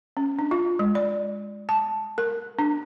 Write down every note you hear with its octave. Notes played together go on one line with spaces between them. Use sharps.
C#4
D4
F4
G#3
D5
A5
A#4
D4